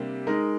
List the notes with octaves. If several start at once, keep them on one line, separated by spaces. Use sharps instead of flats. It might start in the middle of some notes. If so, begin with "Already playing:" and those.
Already playing: C3 G3 A#3 D4
G#3 D#4 A#4